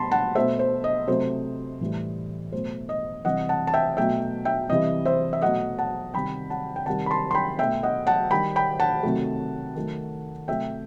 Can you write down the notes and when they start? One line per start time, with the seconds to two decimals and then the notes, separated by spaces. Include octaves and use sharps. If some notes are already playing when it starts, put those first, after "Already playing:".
Already playing: B2 G3 A5 B5 C6
0.12 F#5 A5
0.35 B2 A3 C5 E5
0.59 C5
0.84 D#5
1.07 C3 F#3 A3 C5
1.81 A2 E3 G3
2.52 B2 F#3 A3 C5
2.89 D#5
3.25 C3 E3 G3 D#5 F#5
3.49 F#5 A5
3.67 A5
3.74 E5 G5
3.97 B2 F#3 A3 E5 G5
4.45 E5 G5
4.70 C3 E3 G3 D#5
5.05 C5 E5
5.33 E5
5.42 B2 F#3 A3 D#5 F#5
5.79 F#5 A5
6.14 C3 D#3 G3 G5 B5
6.50 F#5 A5
6.76 G5
6.86 C3 D#3 G3 F#5 A5
7.06 B5
7.11 A5 C6
7.31 C6
7.35 G5 B5
7.58 B2 A3 E5 G5
7.83 D#5 F#5
8.07 F#5 A5
8.31 D#3 G3 G5 B5
8.56 G5 B5
8.80 F#5 A5
9.03 C3 D#3 F#3 A3
9.76 D#3 F#3 A3
10.48 C3 F#3 A3 E5 G5